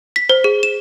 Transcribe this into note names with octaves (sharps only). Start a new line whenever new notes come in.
B6
C5
G#4
E7